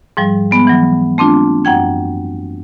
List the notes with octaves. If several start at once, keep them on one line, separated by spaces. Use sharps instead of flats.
G#2 F3 G3
G#3 B3
E3 F#3
A3 C4 D4 F4
F#2 F#5 G5 G#6